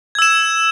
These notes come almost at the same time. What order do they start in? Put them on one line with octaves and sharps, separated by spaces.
G#6 E6 E7